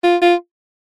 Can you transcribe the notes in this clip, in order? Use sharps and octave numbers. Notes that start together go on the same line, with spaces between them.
F4
F4